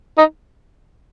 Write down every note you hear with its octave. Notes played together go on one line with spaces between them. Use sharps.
D#4